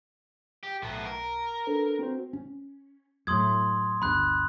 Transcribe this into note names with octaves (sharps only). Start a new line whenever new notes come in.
G4
B1 A2 B3 A5 A#5
A#4
D4 A4 B4
C4 F#4 C5
C#4
F#2 A2 C6 D#6 G#6
G1 D2 B5 F#6